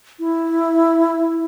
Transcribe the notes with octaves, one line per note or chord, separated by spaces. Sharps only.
E4